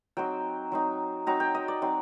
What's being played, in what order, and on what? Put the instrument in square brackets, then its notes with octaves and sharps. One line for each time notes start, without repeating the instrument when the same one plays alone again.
[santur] F#3 C4 D#4 G5
F#3 C4 D#4
F#3 C4 D#4 A#5
G5
D#5
D5
F#3 C4 D#4